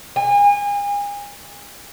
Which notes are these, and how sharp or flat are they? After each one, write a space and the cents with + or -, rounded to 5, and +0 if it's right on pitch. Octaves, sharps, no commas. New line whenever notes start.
G#5 -35